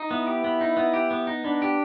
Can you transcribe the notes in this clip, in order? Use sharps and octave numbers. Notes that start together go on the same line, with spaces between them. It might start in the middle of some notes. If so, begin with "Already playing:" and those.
Already playing: D#4
B3 E4
G4
B3
D#4
B3
G4
B3
D#4
B3 D4
G4